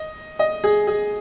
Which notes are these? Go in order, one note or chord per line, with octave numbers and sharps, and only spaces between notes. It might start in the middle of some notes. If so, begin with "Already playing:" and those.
Already playing: D#5
D#5
G#4
G#4